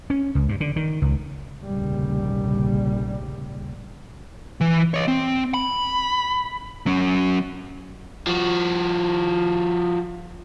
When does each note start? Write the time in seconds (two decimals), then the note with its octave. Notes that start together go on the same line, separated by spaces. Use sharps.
0.10 C#4
0.35 C#2
0.49 G2
0.61 D3
0.76 D#3
1.02 C#2
1.63 F1 A#1 D#2 A#2 C#3 G3
4.61 E3
4.94 C#5 D#5
5.08 C4
5.54 B5
6.86 F#3 C#4
8.27 F3 F#4